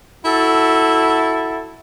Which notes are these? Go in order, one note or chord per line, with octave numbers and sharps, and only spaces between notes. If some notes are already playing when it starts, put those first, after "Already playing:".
E4 F#4 A4